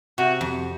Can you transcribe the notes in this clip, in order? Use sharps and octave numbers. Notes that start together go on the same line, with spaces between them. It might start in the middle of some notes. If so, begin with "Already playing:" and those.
C3 F#4
F2